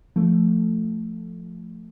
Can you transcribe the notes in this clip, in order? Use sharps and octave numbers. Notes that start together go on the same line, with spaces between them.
F3 A3